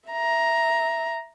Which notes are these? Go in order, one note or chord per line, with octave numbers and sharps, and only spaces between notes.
E5 A#5